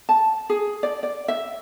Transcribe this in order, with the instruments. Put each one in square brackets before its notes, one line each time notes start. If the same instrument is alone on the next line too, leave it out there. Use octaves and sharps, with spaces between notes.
[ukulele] A5
G#4
D5
D5
E5